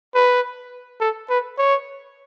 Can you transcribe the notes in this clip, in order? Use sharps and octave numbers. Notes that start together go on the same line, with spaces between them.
B4
A4
B4
C#5